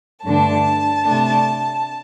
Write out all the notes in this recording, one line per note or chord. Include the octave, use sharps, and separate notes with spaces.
G2 D3 A3 D4 A5
C3 A3 D4